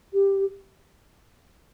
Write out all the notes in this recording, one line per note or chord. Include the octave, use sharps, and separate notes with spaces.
G4